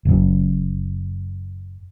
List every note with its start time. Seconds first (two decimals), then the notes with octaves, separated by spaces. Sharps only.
0.05 F#1 F#2